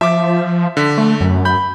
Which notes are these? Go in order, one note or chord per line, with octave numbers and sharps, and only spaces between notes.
F3 E5 D6
D3 B6
A3
F#2
B5 G6